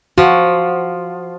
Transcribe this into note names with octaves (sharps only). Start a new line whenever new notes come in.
F3 F#4